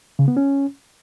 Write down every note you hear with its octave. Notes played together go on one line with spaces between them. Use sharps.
C#3
B3
C#4